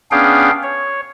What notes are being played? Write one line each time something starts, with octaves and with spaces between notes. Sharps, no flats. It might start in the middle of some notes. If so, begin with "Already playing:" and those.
B3 C#4 D4 G#4 F5 G5
C#5